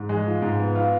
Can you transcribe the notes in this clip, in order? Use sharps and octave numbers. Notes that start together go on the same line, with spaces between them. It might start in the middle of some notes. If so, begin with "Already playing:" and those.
Already playing: G#2
G#3
F3
G#2
B3
F4